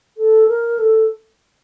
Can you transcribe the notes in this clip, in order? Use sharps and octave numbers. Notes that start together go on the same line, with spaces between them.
A4
A#4
A4